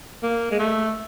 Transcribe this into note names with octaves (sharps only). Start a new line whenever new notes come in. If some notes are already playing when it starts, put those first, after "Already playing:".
A#3
G#3
A3